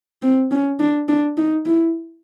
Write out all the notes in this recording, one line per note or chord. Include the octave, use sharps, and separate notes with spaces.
C4
C#4
D4
D4
D#4
E4